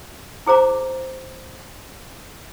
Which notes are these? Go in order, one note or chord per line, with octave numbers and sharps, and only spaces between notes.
E4 G#4 C5 A#5 D6